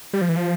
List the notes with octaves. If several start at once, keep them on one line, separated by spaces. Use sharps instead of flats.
G3
F3
E3
F3